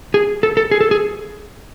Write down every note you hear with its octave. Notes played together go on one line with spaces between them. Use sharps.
G#4
A4
A4
G#4
A4
G#4